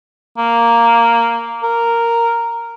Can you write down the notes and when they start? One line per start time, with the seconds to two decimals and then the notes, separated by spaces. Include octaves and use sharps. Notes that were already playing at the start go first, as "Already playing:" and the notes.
0.37 A#3
1.63 A#4